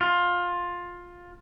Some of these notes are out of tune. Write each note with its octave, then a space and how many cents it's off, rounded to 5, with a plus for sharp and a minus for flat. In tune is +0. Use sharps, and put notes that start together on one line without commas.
F4 +15